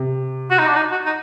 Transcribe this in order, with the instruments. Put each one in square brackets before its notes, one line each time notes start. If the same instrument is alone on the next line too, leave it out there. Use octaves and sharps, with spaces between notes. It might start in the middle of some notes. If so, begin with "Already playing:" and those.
Already playing: [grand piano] C3
[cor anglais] F#4
D#4
D4
D#4
F#4
D#4